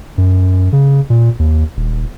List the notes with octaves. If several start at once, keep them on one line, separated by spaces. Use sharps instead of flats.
F#2
C#3
A#2
D#2
D#1